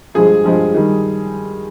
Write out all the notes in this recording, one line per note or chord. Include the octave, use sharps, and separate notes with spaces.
G2 F3 G#3 G#4
G2 F3 G#3
D#3 G3